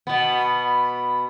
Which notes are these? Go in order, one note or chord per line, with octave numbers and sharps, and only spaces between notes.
B2 B3